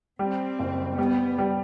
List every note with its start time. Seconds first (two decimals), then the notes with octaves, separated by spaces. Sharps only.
0.19 G3 C4
0.59 F#1
0.98 G3 B3
1.38 G3